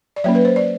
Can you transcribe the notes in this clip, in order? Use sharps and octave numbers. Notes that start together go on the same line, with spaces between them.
D5
F#3 A#3 C#4 C#5
B4
C5
D5